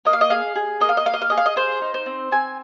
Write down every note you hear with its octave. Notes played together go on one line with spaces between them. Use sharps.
A#3 D#5
F5
D#5
G#4 F5
G#4
A#3 D#5
F5
D#5
A#3 F5
D#5
F5
G#4 D#5
F5
D#5
G#4 C5
D#4
C5
C4
C4 G#5